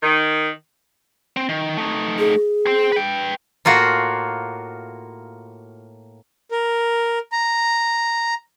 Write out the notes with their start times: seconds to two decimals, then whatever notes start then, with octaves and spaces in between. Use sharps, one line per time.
0.02 D#3
1.37 C4
1.49 D#3
1.77 A3 D#4
2.19 G#4
2.67 C5 G5
2.92 B4 G5
3.65 A2 A#3 F4 F#4
6.51 A#4
7.32 A#5